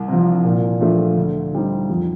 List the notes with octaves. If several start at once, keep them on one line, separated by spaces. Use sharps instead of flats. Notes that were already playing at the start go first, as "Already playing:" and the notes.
Already playing: C2
C3 F3
A#2
F3 A3 D4
D2
D3 G3 C4 D#4
F2